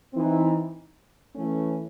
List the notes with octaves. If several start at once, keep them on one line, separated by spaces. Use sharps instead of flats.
E3 C4 D#4
E3 A3 C#4